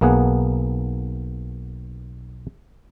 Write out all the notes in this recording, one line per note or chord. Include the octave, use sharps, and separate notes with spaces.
B1 A#3 B3 G#4 F#5